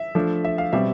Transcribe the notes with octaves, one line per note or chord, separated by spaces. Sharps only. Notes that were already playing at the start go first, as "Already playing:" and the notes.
Already playing: E5
F3 A3 D4
E5
F5
B2 G3 C4 E5